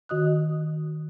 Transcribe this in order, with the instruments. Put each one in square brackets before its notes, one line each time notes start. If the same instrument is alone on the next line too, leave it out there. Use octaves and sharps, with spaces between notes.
[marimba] D#3 F#4 D#5 D#6 F#6